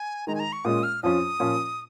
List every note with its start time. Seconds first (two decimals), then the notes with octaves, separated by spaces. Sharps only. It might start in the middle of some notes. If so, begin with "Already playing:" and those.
Already playing: G#5
0.27 D#3 G#3 D#4 A#5
0.35 G#5
0.40 A#5
0.53 C#6
0.65 A#2 G#3 C#4 F4 D#6
0.83 F6
1.03 F2 F3 C#4 F4 D#6
1.40 A#2 F3 C#4 F4